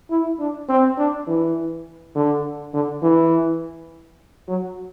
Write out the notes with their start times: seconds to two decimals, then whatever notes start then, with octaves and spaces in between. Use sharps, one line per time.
0.10 E4
0.39 D4
0.69 C4
0.98 D4
1.27 E3
2.15 D3
2.74 D3
3.03 E3
4.48 F#3